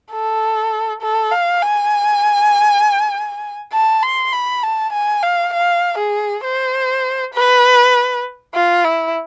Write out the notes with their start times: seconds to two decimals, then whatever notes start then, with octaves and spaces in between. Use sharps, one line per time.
0.11 A4
1.02 A4
1.31 F5
1.62 G#5
3.72 A5
4.02 C6
4.32 B5
4.63 A5
4.92 G#5
5.22 F5
5.53 F5
5.98 G#4
6.43 C5
7.34 B4
8.54 F4
8.84 E4